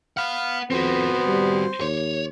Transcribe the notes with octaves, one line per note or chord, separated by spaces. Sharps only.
F5 F#5 B5 F6
F2 B3 C4 F#4 C5
G3
D#2 C#5